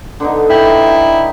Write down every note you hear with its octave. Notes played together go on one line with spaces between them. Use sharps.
D3 B3 D#4
E4 G5